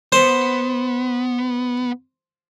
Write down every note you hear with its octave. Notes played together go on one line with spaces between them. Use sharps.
B3 C5